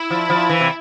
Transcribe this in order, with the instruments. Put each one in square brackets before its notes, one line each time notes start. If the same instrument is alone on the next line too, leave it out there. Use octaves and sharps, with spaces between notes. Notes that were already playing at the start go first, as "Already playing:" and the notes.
Already playing: [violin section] E4
[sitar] F3
F3
E3
C3